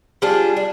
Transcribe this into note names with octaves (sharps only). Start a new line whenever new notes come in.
G3 D4 F4 G#4
D4